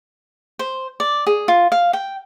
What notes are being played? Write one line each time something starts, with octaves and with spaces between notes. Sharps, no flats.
C5
D5
G#4
F4
F5
G5